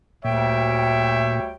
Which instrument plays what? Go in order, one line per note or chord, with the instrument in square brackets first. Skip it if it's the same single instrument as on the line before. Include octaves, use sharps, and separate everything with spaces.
[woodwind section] D2 G5 [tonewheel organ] A#2 [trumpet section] G3 C#5 E5